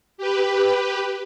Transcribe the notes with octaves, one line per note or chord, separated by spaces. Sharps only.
G4 B4